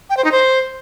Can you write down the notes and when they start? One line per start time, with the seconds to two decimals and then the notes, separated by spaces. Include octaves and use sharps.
0.10 G5
0.17 C5
0.24 D#4
0.32 C5